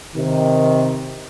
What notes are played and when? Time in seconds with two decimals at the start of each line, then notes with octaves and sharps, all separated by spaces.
0.15 C3 D#3